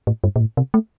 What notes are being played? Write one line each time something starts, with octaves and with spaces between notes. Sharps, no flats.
A2
G2
A#2
A2
C3
A3